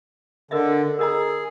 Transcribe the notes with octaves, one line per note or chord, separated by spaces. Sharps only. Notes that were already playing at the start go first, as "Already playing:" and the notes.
D3 A#4 D#5 E5
G#4 A#4 D#5 A#5